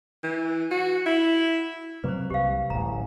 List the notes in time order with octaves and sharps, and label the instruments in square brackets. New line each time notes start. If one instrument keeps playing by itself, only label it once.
[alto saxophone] E3
F#4
E4
[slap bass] C3 F#3 A#3 [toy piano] B4 C5
[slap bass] C2 [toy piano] G4 F5
[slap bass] D1 A1 [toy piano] A#5